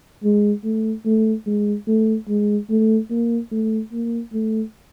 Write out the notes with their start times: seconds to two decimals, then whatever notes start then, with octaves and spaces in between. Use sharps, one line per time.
0.24 G#3
0.64 A3
1.05 A3
1.46 G#3
1.87 A3
2.28 G#3
2.70 A3
3.10 A#3
3.51 A3
3.92 A#3
4.33 A3